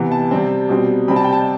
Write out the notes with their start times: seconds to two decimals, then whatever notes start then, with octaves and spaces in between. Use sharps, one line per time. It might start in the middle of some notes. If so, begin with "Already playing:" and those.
Already playing: C3 E3 B3
0.12 A5
0.31 C3 G3 C4
0.69 B2 G3 C4
1.08 C3 G3 C4 B5
1.16 A5
1.24 G5
1.33 A5